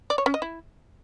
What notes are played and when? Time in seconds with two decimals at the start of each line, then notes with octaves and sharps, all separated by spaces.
0.10 D5
0.18 C#5
0.26 C#4
0.34 D#5
0.42 E4